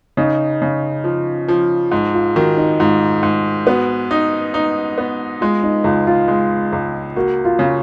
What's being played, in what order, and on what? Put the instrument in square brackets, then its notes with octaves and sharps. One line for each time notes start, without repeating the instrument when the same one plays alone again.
[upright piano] C#3 [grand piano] D#4
[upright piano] C#3
F3
F3
[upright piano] G#2 [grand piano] D#4
[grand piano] F4
[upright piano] D#3 [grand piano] F#4
[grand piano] D#4
[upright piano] G#2 [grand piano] F4
[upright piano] G#2
[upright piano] B3 [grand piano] F#4
[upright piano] D#4
D#4
B3
[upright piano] G#3 [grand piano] F4
[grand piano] D#4
[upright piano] C#2 [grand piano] F4
[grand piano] F4
[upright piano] G#3
C#2
[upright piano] A#3 [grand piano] F#4
[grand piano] F4
[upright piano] C#3